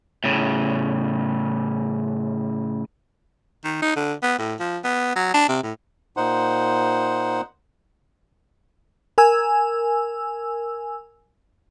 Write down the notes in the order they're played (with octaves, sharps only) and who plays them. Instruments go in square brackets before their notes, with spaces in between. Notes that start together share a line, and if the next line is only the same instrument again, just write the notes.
[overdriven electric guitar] A2 C#3
[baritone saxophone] D#3
D#4
D3
B3
A2
F3
B3
F#3
D4
C3
A2
[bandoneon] A#2 D#4 C5 F#5
[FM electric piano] A#4 G#5 E6